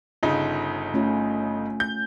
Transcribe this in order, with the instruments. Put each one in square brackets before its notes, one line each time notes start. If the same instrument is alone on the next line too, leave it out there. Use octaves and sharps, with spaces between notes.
[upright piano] G1 C#3 D#4 [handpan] F4
[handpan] A3 C#4 F4
[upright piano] G6